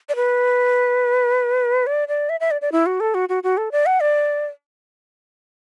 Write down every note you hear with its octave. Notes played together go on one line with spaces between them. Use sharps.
D5
B4
D5
D5
E5
E5
D5
D5
E4
F#4
A4
F#4
F#4
F#4
A4
D5
F#5
D5